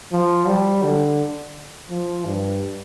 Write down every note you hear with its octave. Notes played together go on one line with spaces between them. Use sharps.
F3
G3
D3
F3
G2